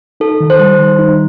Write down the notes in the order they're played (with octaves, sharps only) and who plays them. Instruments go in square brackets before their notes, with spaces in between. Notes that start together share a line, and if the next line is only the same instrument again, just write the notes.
[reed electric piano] D#4 [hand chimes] A4
[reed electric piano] D#3
[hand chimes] C5
[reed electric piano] G3
D#3
D#4